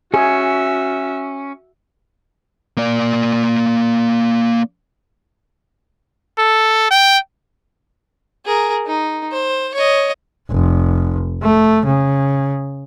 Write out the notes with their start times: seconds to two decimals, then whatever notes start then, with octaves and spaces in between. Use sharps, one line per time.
0.14 C#4 F#4 G#4 E5
2.77 A#3 D5
6.38 A4
6.91 G5
8.46 G#4 A#4
8.86 D#4
9.32 C5
9.75 C#5 D#5
10.51 F1
11.43 A3
11.87 C#3